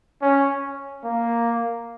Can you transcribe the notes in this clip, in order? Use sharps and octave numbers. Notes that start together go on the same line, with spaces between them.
C#4
A#3